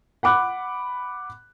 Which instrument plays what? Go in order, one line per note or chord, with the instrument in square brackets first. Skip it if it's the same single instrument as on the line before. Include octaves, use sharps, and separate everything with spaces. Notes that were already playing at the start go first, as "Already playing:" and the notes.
[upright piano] F#5 B5 D6 F#6